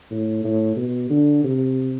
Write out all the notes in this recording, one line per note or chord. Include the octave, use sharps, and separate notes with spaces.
A2
A2
B2
D3
C3